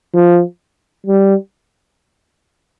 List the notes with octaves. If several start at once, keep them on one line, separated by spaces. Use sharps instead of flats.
F3
G3